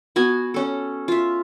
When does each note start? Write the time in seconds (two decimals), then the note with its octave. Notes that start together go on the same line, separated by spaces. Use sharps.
0.16 B3 F#4 G#5
0.54 C#4 A4
1.08 F4 E5